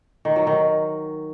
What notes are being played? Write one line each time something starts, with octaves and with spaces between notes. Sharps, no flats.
D#3
F#3
D#3